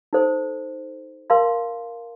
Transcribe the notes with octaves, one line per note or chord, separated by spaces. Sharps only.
D#4 A4 C5
A#4 F5 A5 C6